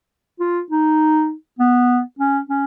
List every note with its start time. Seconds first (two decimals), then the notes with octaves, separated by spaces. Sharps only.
0.40 F4
0.71 D#4
1.59 B3
2.19 C#4
2.49 C#4